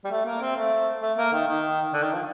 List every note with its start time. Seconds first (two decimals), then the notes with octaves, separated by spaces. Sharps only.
0.05 G3
0.11 A3
0.26 A#3
0.41 C4
0.57 A3
1.02 A3
1.18 A#3
1.33 D#3
1.48 D#3
1.94 D3
2.03 D#3
2.13 F3